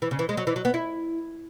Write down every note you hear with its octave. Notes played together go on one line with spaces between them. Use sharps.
E3
C#3
E3
G#3
F#3
E3
F#3
B3
E4